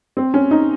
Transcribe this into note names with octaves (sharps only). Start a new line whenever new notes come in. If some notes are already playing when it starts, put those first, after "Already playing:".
C4
C#4
D#4